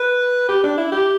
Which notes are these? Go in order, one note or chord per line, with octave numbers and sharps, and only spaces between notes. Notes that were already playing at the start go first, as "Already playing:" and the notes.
Already playing: B4
G4
D4
E4
G4